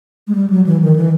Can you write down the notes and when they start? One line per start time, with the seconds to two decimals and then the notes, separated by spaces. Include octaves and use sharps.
0.28 G#3
0.35 G3
0.50 F#3
0.66 E3
0.82 D#3
0.96 E3